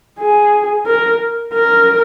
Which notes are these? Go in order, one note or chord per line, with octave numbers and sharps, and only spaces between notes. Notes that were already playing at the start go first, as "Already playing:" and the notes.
G#4
A#4
A#4